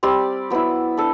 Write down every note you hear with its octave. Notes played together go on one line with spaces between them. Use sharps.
G3 C4 G4 D5
F#3 B3 E4
D4 A4